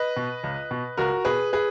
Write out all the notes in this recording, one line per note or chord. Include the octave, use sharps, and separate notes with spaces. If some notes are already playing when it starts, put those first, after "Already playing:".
Already playing: B4 D#5
B2
C#2
B2
C#2 F#4 A#4
B2 G#4 B4
G#4 B4